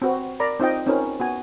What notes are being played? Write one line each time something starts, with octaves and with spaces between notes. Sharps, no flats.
C4 F#4 B4
A#4 D5 A#5 B5
C4 D#4 F4 D#5 G5
C4 C#4 D#4 F4 A#4 B4
B3 F#4 G#5